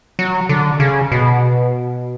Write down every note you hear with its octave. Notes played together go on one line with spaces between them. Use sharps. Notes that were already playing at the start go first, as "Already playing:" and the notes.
F#3
D3
C#3
B2